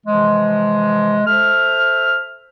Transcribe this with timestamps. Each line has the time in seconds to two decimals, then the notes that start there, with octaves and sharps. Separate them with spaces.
0.06 C3 E3 F3 G#3
1.26 A4 C5 E5 F6